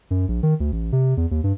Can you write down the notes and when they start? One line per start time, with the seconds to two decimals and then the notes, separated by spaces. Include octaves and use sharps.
0.11 F#2
0.28 A#1
0.43 D#3
0.60 D2
0.72 A1
0.92 C3
1.17 E2
1.31 D#2
1.44 G2